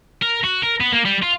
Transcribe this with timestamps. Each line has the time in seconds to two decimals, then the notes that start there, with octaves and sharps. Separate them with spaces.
0.22 A#4
0.44 F#4
0.63 A#4
0.81 B3
0.92 A#3
1.05 G3
1.23 F4